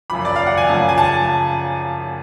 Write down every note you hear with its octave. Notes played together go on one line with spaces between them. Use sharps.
F#2 C#3 F3 B5
D5
F5
F#5
G#5
F#2 C#3 F3 A5
G#5
A5